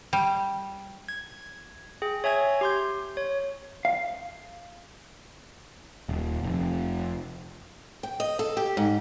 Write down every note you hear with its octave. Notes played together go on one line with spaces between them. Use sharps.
G3
G#6
G#4 G5
C#5 E5 G#5 G#6
G4 C6 G6
C#5
F5
D#1
F1
G5
D#5
A4
G4
G#2